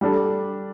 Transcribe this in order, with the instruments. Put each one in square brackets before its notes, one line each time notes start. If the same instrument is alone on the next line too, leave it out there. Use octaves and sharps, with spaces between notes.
[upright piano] G3 D4 A4